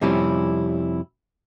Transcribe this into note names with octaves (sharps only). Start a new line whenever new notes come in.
F2 C3 G3 C#4 E4